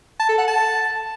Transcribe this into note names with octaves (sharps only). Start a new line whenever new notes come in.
A5
A4
F#5
A5